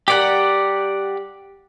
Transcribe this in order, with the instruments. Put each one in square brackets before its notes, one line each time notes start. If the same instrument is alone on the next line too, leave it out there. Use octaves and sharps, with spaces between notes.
[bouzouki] G3 A#4 [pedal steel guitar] G4 D5 F#5